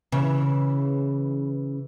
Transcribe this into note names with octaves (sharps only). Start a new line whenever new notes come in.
C#3 E3